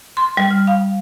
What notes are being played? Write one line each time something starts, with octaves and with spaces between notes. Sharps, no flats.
C6
G3
F6
F5